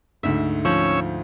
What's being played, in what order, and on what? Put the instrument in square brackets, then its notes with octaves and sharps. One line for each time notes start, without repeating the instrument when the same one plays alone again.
[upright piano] D2 G#2 [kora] E5
[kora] F3 [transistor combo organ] C#4 C#5 E6